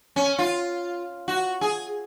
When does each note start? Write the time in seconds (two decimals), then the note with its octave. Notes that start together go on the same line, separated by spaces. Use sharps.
0.16 C#4
0.39 F4
1.28 F#4
1.61 G#4